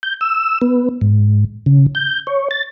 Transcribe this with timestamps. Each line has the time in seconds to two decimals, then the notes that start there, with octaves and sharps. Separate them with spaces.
0.03 G6
0.21 E6
0.61 B3
1.01 G#2
1.66 C#3
1.95 G6
2.27 C#5
2.51 A6